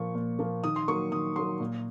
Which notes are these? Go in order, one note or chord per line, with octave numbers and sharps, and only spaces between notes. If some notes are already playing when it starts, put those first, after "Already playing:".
Already playing: A#2 F3 A#3 C#6
A#2
F3 A#3
D#3 D#6
C6
F#3 A#3 C#6
D#3 D#6
F#3 A#3 C6
A#2